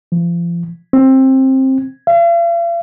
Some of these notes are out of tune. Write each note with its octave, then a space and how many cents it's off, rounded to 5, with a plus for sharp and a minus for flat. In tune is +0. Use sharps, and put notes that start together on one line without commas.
F3 -35
C4 +20
F5 -45